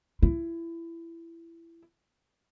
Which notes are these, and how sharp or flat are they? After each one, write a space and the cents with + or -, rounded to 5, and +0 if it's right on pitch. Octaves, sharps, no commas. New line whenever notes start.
E4 +20